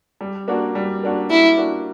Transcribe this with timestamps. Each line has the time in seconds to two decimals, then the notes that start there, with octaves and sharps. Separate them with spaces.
0.21 G3
0.48 A#3 D4 F#4
0.75 G3
1.03 A#3 D4 F#4
1.30 G3 E4
1.57 A#3 D4 F#4